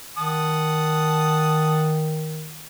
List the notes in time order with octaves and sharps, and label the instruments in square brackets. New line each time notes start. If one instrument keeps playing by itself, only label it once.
[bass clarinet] D#3 [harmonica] F#5 A5 D#6